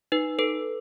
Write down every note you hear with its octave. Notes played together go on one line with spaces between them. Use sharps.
D#4 B4
A4 B4